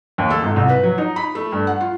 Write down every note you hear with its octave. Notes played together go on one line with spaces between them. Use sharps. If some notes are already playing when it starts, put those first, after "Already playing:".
D#2
A4
G#1
C2
B4
F#3
D#4
B5
A3
G2
F#5
F4